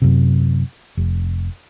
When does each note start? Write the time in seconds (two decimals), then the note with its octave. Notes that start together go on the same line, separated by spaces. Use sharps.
0.02 F#2 C3
0.97 F1